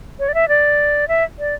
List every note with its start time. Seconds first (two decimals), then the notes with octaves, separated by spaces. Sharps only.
0.19 C#5
0.28 D5
0.34 E5
0.48 D5
1.08 E5
1.39 D5